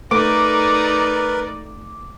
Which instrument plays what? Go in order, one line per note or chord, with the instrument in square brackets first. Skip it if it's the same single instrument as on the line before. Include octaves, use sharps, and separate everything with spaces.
[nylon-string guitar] A3 [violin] D#4 D5 [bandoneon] A#4 B4 [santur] D6